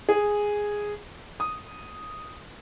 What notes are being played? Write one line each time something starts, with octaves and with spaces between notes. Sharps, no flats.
G#4
D#6